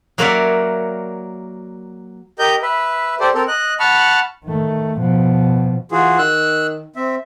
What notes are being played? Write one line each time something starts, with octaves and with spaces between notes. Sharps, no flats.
F#3 A#3 A#4 C#5 D5 E5
G4 A#4 D#5 G6
B4 E5
G4 A4 C5 D5
C4 A4 A#4
D#5 F#6
F#5 A5 B5 C#6 F6
D#3 A3
B2 F3
E3 F4 F#4 G#4
D#3 E6 F#6
C4 E5